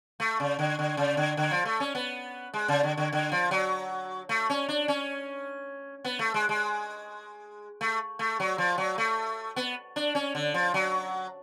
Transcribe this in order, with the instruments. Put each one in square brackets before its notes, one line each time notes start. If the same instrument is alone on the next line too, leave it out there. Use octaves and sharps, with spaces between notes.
[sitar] A3
C#3
D3
D3
C#3
D3
D3
F3
A3
C#4
B3
G#3
C#3
D3
D3
D3
F3
F#3
A3
C#4
D4
C#4
B3
A3
G#3
G#3
A3
A3
F#3
F3
F#3
A3
B3
D4
C#4
D3
F3
F#3